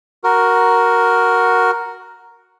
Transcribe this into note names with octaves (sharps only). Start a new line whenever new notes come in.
F#4 A#4